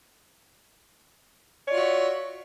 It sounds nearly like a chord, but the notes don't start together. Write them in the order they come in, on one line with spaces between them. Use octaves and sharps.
C#5 D5 F4 F#4 E5